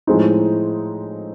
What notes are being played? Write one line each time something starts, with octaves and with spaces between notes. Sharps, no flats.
A2 F3 G#3 C4 D#4